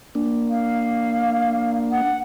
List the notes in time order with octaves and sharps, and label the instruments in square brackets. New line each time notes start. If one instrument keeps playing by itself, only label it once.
[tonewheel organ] A#3 D4
[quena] F5
F#5